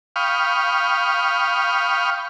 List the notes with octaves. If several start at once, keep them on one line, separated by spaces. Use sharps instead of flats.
F5 G5 B5 C#6 D#6 F6